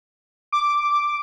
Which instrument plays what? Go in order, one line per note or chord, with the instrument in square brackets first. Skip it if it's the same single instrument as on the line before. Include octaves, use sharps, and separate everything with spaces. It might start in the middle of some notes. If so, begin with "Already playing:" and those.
[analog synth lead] D6